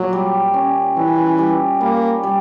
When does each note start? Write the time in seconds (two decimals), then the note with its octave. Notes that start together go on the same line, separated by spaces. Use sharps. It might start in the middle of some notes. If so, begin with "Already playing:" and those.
Already playing: A#2 F#3
0.13 G3
0.54 C#4
0.96 E3 C#4
1.38 G3
1.81 G3 A#3
2.23 G3